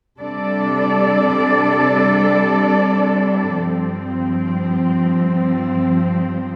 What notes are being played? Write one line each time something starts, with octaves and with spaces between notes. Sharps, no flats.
C3 G3 D4 A4 D5
G2 F3 C4